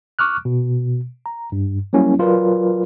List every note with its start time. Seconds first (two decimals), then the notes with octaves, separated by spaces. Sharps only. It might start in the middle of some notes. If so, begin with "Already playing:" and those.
0.19 C#6 D6 F6 F#6
0.45 B2
1.26 A#5
1.52 G2
1.93 F#3 G3 A#3 C#4 E4
2.19 F#3 F4 A#4 B4 D5